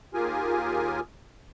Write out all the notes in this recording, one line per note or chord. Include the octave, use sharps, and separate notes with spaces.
D#2 F4 G4 G#4 A#4 G#5